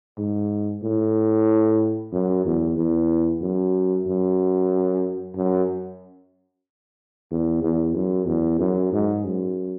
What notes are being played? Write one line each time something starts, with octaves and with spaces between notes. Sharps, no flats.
G#2
A2
F#2
E2
E2
F#2
F#2
F#2
E2
E2
F#2
E2
F#2
G#2
F#2